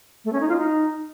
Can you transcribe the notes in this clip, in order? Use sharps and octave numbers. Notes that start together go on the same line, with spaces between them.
A3
C#4
D#4
F4
D#4